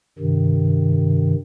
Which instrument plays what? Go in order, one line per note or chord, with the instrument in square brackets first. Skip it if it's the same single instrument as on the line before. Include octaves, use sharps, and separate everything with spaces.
[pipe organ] G2 C3 D#3